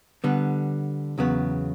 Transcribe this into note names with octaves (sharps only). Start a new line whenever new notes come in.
D3 G3 B3
E2 C#3 F#3 B3